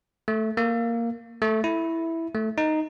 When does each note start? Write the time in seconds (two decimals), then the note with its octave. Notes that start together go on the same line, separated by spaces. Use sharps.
0.28 A3
0.57 A#3
1.42 A3
1.64 E4
2.34 A3
2.58 D#4